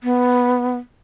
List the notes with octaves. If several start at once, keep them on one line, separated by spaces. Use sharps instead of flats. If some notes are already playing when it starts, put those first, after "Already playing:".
B3